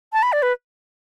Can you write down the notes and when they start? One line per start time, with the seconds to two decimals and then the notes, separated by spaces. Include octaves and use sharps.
0.13 A5
0.23 B5
0.33 D5
0.42 B4